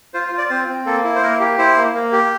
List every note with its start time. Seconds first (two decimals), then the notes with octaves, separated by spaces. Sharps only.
0.14 F4 C5
0.26 C5
0.32 F4
0.38 D5
0.50 C4 C5
0.68 C4
0.86 A#3 A4
1.04 E4
1.16 C5
1.22 A#3 A#4
1.40 G4
1.58 E4 C5
1.77 A#3
1.94 A#3
2.12 G4